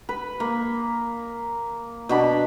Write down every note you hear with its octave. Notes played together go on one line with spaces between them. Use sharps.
B4
A#3
B2 D4 B5